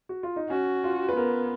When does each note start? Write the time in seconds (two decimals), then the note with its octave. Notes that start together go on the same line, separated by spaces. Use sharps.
0.09 F#4
0.23 F4
0.36 D#4
0.49 C#4 F#4
0.84 F4
1.09 B4
1.16 B3 A#4